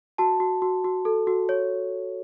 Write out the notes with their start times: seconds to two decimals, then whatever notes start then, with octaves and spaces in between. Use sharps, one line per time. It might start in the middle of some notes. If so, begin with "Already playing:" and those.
0.18 F#4 A5
0.40 F#4
0.62 F#4
0.84 F#4
1.05 A4
1.27 F#4
1.49 C#5